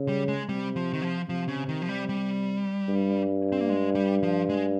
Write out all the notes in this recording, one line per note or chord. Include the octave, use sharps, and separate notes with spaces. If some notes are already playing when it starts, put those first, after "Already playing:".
Already playing: C#3
G3
G#3
C3 G3
F3
D#3
F3
C3 F3
C#3
D#3
F3
G3
G3
G2
C4
A#3
G#3
G3
F3
G#3